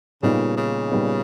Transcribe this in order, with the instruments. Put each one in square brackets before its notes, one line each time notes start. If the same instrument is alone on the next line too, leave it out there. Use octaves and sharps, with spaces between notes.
[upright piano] A#2 G3 B3 D#4 [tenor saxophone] C#3
[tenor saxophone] C#3
[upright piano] A#2 G3 B3 D#4